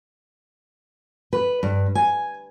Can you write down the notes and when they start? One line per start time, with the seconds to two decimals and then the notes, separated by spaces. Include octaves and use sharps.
1.33 B4
1.63 G2
1.95 G#5